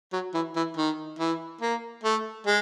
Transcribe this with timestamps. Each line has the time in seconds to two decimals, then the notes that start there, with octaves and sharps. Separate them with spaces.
0.13 F#3
0.34 E3
0.56 E3
0.77 D#3
1.19 E3
1.61 A#3
2.04 A3
2.46 G#3